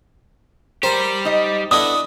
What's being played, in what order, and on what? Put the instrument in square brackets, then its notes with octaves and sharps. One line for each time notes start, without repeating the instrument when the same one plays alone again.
[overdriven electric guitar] G3 G4 [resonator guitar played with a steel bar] A#4 [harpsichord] C5
[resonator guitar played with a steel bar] D#4 D#5
[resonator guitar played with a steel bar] B3 A4 [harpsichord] D4 E4 D#5 [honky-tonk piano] D#6